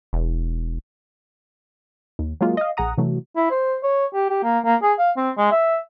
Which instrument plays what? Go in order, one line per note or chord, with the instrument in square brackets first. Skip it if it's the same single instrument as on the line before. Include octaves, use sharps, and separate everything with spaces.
[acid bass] E1
[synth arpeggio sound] D#2
F#3 G#3 A#3 F4
D#5 F5
A#1 G#4 F#5 A#5 D#6
C3 E3 F#3 A3
[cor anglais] E4
C5
C#5
G4
G4
A#3
A#3
G#4
F5
C4
G#3
E5